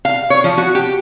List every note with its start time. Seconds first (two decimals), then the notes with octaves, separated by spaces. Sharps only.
0.05 F5
0.30 C#5
0.44 F3
0.58 F#4
0.75 G4